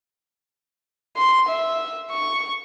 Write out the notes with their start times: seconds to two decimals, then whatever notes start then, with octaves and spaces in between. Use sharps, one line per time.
1.17 C6
1.49 E5
2.11 C#6